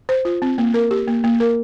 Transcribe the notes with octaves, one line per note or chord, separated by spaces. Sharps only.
C5
F4
C4
A#3
A#4
G4
A#3
A#3
A#4